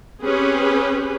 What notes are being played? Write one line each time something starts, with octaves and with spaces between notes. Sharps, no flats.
C4 C#4 G4 G#4 B4